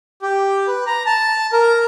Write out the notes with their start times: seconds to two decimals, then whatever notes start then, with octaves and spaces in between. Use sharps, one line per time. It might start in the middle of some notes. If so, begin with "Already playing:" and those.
0.22 G4
0.68 B4
0.87 A#5
1.06 A5
1.53 A#4